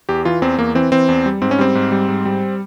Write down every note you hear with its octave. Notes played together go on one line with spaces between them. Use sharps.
E2 G4
E3 F4
E2 C4
E2 A#3
E3 C4
E3 C4
E2
G3
G#2 C4
C#4
G3 C4
G#2
G3
G#2
G3